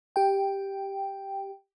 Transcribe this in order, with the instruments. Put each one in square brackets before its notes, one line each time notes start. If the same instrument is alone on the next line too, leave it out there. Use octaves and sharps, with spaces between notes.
[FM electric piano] G4 G5